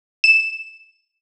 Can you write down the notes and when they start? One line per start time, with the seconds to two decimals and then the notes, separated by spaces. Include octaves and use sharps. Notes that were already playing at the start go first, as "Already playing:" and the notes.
0.24 E7